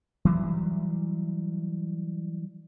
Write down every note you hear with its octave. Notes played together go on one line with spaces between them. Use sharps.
E3 F#3 G3